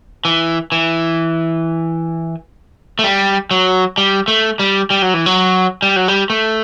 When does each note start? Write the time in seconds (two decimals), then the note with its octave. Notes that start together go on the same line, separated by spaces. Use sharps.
0.25 E3
0.72 E3
2.99 A3
3.04 G3
3.51 F#3
3.98 G3
4.28 A3
4.59 G3
4.90 G3
5.02 F#3
5.14 E3
5.26 F#3
5.82 G3
5.96 F#3
6.08 G3
6.30 A3